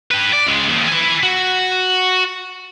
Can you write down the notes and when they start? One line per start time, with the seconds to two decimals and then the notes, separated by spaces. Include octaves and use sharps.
0.11 G4 B4
0.33 D5
0.47 C#2 G#3
0.69 D#2 F3
0.89 B4 G#5
1.23 F#4